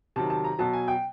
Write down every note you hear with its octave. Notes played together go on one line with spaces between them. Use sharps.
C3 D#3 F#3 A5
A5
A#5
B2 F#3 A5
G#5
G5